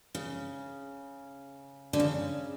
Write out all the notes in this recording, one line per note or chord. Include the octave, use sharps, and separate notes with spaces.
C#3
D3
C#3